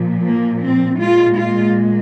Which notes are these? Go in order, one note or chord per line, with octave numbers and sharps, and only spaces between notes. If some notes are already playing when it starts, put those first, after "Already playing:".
Already playing: A#2 F3
A#3
C4
A#2 G#3 F4
F4